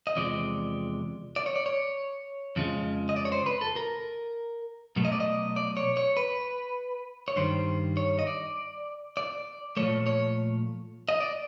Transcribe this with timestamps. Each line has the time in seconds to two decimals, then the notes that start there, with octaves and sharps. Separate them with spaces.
0.07 D#5
0.16 E2 C3 F3 G#3 D5
1.36 D5
1.46 C#5
1.56 D5
1.66 C#5
2.56 F2 C#3 F3 G#3
3.09 D#5
3.16 D5
3.25 C#5
3.32 C5
3.46 B4
3.61 A4
3.76 A#4
4.96 B2 F#3 A3
5.05 D#5
5.12 D5
5.20 D#5
5.56 D5
5.77 C#5
5.97 C#5
6.17 B4
7.28 C#5
7.36 G2 D#3 G3 C5
7.97 C#5
8.19 D#5
8.27 D5
9.17 D5
9.77 A#2 F3 A3 C#5
10.06 C#5
11.09 D#5
11.20 D5